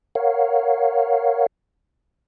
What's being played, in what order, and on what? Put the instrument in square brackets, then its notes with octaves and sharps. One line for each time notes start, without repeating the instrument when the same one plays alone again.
[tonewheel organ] A#4 C#5 F5 F#5